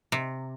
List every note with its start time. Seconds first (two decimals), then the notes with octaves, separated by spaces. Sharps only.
0.12 C3